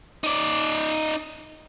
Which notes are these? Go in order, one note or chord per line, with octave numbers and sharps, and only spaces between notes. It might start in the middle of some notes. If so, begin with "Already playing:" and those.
D#4 D5